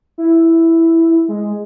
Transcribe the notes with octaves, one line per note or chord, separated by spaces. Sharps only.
E4
G#3